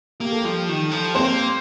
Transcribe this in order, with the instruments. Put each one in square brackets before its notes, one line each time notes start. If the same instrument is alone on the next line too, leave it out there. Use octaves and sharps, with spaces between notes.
[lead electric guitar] A#3 [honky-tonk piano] G4
[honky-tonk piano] A4
[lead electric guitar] F3 [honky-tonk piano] G3 G4
[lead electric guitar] D#3
F3
[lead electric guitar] A#3 [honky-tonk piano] C4 C5